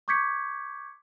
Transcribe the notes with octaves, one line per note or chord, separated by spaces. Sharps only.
C#6 D6 G6 G#6 B6 C#7